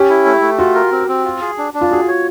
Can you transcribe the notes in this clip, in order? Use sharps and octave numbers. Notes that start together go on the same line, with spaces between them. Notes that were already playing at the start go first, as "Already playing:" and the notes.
Already playing: C#4 G4
E4
A3
A3
F4 F#4
A#4
C4
C4
F4
G#4
D4
D4
F4
F#4 G#4
C#5